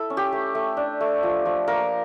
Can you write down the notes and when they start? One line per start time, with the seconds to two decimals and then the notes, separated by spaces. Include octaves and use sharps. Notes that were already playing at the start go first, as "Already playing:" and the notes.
Already playing: E4 A4
0.10 C#4
0.17 G4
0.33 A3
0.55 A3
0.77 D4
1.01 A3
1.23 F3
1.46 F3
1.68 A#3 A#4